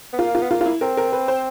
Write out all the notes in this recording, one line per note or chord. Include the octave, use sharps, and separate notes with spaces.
B3
A#3 F4
F4
B3
A#3 F4
F4
E4
C4 A#4
A#4
B4
C5